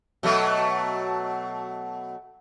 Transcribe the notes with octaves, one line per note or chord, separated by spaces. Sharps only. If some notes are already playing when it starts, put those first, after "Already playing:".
B2 F#3 A3